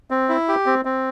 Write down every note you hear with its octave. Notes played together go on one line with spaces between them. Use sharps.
C4
E4
G4
C4
C4